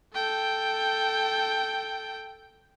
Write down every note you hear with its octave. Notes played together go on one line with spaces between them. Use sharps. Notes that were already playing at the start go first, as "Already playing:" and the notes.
A4 G5